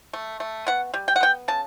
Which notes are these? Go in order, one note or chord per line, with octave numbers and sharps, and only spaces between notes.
A3
A3
B3 F#5
G3
G5
F#5
B3 G5
C#3 A5